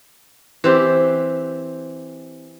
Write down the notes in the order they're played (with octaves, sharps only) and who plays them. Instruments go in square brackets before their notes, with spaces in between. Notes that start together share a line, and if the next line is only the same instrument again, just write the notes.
[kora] E3 C4 G4